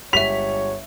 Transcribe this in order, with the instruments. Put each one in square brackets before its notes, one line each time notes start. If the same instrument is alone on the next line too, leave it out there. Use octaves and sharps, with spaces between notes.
[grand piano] G1 G#3 G4 [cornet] C#5 [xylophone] E5 B6 [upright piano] F7